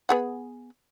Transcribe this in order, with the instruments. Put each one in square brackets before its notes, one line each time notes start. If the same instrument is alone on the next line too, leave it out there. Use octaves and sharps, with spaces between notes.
[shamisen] B3 G#4 F#5